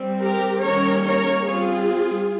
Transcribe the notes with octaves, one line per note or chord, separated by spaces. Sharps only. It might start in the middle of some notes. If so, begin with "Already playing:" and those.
Already playing: G3 C4
G4 A#4
D#3 G3 A#3 C#4 A#4 C#5
A#4 C#5
G3 C4 F4 G#4